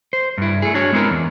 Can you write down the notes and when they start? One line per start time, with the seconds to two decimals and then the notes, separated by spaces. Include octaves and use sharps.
0.13 C5
0.38 G2 E4
0.62 A3 G#4
0.74 D4 F#4 C#5
0.92 G#3 B3 C4 E4 A#4
1.10 E2